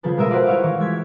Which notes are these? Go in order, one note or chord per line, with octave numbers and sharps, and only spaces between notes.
C#3 F3 G#4 A4 B4
B2 G#3 A#4 E5 D#7
F#4 B4 C5 D5 F5
E4 F#4 C#5 E5 F5
E3
G#3 G#6 B6